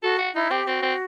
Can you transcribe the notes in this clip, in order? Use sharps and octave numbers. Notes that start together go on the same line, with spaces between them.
F#4 A4
F#4
D#4 E4
C4 G4
C4 F#4
C4